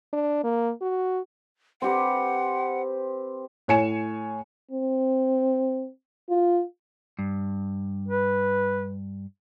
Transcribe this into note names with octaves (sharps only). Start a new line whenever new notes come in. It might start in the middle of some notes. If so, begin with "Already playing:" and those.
D4
A#3
F#4
C4 G4 B4 F#5
A2 C#5 G#5 C#7 E7
C4
F4
G2
B4